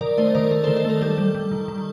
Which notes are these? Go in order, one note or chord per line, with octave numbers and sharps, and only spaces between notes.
D#3 A#4 D5
A3 C5 D#5
D#3 A#4 D5
A3 A#4
D#3 A4 C5
A4 C5
A3 A#4
G3 A4
G3
G3
D#3
D#3